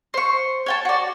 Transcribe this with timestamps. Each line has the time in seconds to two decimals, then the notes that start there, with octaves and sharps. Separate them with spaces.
0.14 C5 C#6
0.66 C#5 G5 A5
0.85 F#4 D5